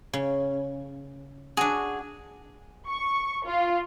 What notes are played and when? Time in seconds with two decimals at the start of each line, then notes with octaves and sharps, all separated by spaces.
0.13 C#3
1.57 D4 F#4 G#4
2.88 C#6
3.46 F4